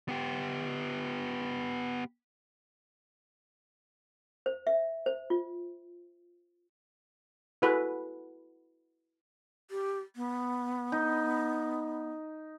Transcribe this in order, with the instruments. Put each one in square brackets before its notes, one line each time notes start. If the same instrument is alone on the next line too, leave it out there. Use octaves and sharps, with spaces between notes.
[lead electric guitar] B3 G4
[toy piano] C5
E5
C5
F4
[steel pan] E4 F#4 G#4 A4 B4
[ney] G4
B3
[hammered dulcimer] D#4